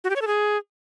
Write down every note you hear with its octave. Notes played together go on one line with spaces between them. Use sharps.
F#4
G4
C#5
A4
G#4